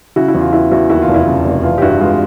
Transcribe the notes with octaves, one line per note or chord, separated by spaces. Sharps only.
C#3 E4 F#4
E4
E2
F4
E3 E4 F#4
E2 E4 F#4
D#2 E4 F#4
F4
F1
E4
C#3
F1
E3 F4
G4
G2 E4 F#4
G#3 F4